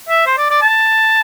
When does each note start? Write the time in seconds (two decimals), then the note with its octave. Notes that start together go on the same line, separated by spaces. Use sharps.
0.09 E5
0.26 C5
0.38 D5
0.50 D5
0.62 A5